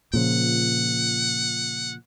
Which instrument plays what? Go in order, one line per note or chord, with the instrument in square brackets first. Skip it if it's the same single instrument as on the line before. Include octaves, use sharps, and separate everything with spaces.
[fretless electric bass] A#2 C#3 F3 [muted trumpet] F#5